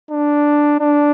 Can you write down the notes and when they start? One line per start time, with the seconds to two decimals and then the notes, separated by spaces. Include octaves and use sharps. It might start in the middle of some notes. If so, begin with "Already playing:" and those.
0.10 D4
0.80 D4